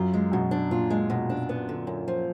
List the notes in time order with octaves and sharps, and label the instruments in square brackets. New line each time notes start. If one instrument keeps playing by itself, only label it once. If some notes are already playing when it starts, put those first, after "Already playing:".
Already playing: [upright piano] F#2 [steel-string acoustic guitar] F4
[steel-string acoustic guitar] G#3
[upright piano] F#2 [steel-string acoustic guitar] B2
[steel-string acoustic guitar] D4
[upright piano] A#2 [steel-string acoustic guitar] F4
[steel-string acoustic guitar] G#3
B2
D4
B3
D3
F#2
F3